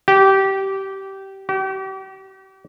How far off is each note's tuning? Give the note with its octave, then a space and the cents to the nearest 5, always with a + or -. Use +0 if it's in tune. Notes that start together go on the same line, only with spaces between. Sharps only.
G4 -20
G4 -40